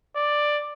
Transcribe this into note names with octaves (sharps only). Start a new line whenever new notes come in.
D5